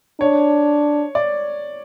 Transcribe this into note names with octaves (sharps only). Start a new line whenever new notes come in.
D4 C#5
D5